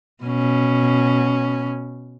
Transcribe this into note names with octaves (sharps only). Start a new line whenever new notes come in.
B2 C#4